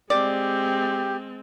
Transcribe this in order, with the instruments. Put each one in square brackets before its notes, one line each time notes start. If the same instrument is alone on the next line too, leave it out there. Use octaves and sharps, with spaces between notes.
[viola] G#3 C4 [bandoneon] G4 [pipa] D5